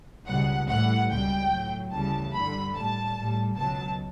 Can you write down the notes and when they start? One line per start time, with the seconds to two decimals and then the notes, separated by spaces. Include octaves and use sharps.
0.27 C#2 B2 G3 F#5
0.68 A2 E3 G3 F#5
1.10 C#2 B2 G3 G5
1.51 A2 F#3
1.93 D2 C#3 E3 G3 A5
2.33 G2 D3 G3 B5
2.74 A2 G3 A5
3.16 A2 G3
3.57 C#2 B2 F#3 A5